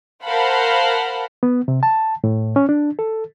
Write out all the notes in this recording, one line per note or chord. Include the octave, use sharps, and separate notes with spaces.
A#4 C5 F5 F#5 A5 B5
B3
C3
A5
A2
C#4
D4
A4